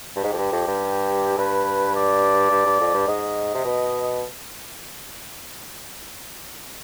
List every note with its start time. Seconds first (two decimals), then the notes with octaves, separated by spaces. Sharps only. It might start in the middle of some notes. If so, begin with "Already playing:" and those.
0.16 G2
0.24 G#2 G4
0.34 F2
0.38 G2
0.52 F2
0.68 G2
1.38 G2 B4
1.95 D5
2.51 G2
2.66 G2
2.80 F2
2.94 G2
3.08 G#2 D#5
3.54 C3
3.65 B2